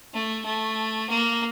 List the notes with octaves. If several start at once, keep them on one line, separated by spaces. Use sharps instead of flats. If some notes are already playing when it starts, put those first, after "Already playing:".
A3
A3
A#3